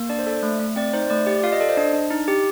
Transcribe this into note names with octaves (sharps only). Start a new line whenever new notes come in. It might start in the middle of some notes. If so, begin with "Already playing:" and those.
Already playing: A#3
D4 D5
C5
A4 D5
A3
A3
C4 D5
D#4 C5
A3 D5
G4 D5
F4 F5
D#5
A4 D5
C5 D#5
D4
D4
D#4
G4